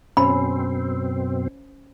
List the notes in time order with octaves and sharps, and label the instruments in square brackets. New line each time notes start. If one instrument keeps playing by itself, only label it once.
[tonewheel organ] F#2 B2 C4 [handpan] C#4 C5 [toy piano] B5